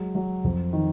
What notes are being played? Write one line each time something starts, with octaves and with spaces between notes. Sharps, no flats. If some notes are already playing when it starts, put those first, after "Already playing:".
Already playing: F#3 G#3
F#3
F2
D#3